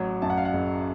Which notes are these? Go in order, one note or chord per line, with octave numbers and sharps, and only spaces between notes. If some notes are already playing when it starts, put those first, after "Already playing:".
Already playing: A1 F#3
F#2 A5
F#5
F5
F#5
F#1